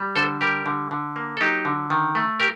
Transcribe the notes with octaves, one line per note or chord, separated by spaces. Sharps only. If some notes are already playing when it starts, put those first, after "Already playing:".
Already playing: G3
D3 A4 C5
G3 G4 A#4
D3
D3
A#3
A4
F#3 D#4 G4
D3
D#3
A3
G4 A#4